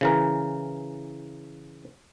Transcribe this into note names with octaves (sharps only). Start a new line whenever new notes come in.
C#3 E3 A#4